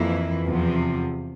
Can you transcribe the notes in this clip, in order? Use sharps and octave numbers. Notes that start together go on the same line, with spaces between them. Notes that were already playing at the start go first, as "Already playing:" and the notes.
Already playing: F2 E3 A#3 E4
E2 C3 F3